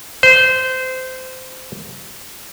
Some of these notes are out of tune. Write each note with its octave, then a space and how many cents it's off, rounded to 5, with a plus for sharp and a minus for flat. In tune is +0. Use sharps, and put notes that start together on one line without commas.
C5 -20